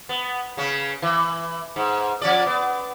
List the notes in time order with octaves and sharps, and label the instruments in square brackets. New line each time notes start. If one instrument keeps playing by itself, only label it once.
[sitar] B3
C#3 C#4
E3
G#2
F3 C#4 D5
B3